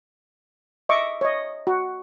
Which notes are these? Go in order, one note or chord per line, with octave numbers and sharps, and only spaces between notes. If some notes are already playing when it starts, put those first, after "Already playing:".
D#5 E5 C#6 D6
C#5 D#5
F#4